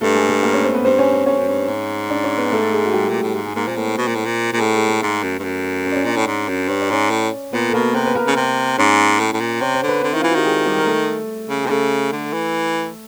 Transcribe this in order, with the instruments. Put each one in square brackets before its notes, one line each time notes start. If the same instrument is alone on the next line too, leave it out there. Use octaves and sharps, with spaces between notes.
[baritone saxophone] G2 [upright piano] A3 A4
[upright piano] G#3 G#4
A3 A4
A#3 A#4
C#4 C#5
C4 C5
B3 B4
[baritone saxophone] G2 [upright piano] C4 C5
[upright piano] C#4 C#5
C4 C5
[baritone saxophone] G2 [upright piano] C#4 C#5
[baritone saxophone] F#2
G2
G#2
[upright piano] D4 D5
C#4 C#5
B3 B4
A3 A4
G#3 G#4
F#4
G3 G4
[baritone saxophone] A#2
A2
G#2
[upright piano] G#3 G#4
[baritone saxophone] G#2 [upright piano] A#3 A#4
[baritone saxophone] A#2 [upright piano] C4 C5
[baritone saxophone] A2
B2
A#2
A2
A#2
[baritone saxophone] A#2 [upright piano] G#4
[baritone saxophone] A2 [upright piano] A3 A4
[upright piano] G#3 G#4
A3 A4
[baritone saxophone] G#2 [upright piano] A3 A4
[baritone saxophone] F#2
G2
F#2
[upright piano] C#4 C#5
D5
C#4 C#5
[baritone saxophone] A#2 [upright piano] D4 D5
[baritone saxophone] A2 [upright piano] C#4 C#5
[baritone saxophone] G#2
F#2
[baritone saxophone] G2 [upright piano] C#5
[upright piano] D5
[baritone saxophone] G#2 [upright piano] C#4 C#5
[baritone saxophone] A2
[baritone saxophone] A#2 [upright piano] B3 B4
[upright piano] A4
[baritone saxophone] B2 [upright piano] A#3 A#4
[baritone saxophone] C3 [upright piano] B3 B4
[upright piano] B4
A#3 A#4
[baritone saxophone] C#3
C3
[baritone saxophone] G#2 [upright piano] C#4 C#5
[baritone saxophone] A2
A2
A#2
[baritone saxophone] C3 [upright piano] C#5
[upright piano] C5
[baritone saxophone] D3 [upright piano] B4
[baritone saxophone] D3 [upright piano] C4 C5
[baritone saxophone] D#3 [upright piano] E4
[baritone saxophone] E3 [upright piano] F4
[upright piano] F#4
[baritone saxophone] D#3 [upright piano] G4
[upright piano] G#3 G#4
G3 G4
A#4
A3 A4
[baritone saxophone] C#3
[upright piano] G#4
[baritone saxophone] C3
[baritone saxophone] C#3 [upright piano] A3 A4
[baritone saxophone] D3
E3